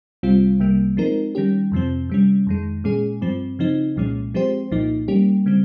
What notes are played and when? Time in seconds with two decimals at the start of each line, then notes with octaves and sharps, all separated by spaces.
0.23 C2 C3 G3 C4 F4
0.60 C2 C3 G3 A#3
0.97 F3 G#3 C4 D#4 A#4
1.35 D#3 G3 C#4 G4
1.72 F2 C3 F3 C4
2.10 C3 G3 C#4
2.47 F2 D#3 G#3
2.84 A#2 G#3 C#4 G#4
3.21 G2 F3 C4
3.59 C#3 F3 C4 D#4
3.96 C2 A#2 F3 G#3 C#4
4.34 F3 G#3 C4 G4 C5
4.71 C2 A#2 F3 A#3 D#4
5.08 G3 A#3 C#4 G4
5.46 C#3 G3 C4